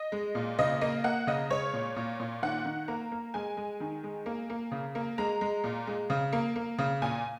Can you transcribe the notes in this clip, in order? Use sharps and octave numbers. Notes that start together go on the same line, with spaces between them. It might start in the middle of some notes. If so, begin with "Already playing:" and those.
Already playing: D#5
G#3
A#2
C#3 D#5
A#3 D#5
A#3 F#5
C#3 D#5
G#3 C#5
A#2
A#2
A#2
D#3 F#5
D#3
A#3 A#5
A#3
G#3 G#5
G#3
D#3
G#3
A#3
A#3
C#3
A#3
G#3 A#5
G#3
A#2
G#3
C#3
A#3
A#3
C#3
A#2 G#5